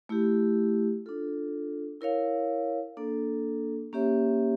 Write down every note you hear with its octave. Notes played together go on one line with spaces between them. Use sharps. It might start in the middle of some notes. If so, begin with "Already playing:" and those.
A3 E4 G4
D4 F4 A4
E4 A#4 C#5 F5
A#3 D4 A4
A#3 C#4 G4 C#5 E5